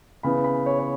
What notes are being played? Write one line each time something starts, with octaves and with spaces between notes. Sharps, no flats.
C#3 E3 B3 B5
B5
C#5
C#5